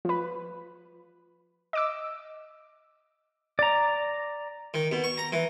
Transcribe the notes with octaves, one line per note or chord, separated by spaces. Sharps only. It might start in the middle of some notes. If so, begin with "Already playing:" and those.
F3 B4
D#5 D6 E6
D5 A#5
D#3
B2
C#6
A#5
E3